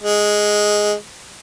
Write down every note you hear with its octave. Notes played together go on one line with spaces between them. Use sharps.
G#3